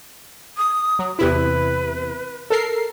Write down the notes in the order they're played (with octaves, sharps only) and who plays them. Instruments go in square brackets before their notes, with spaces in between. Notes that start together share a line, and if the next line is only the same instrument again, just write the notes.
[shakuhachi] D#6
[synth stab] F#3
[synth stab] E2 C3 E4 [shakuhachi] B4
[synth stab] A4 A#4 C7